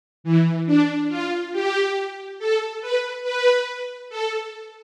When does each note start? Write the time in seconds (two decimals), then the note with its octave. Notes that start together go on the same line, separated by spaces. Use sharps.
0.24 E3
0.66 D4
1.09 F4
1.52 G4
2.39 A4
2.82 B4
3.24 B4
4.10 A4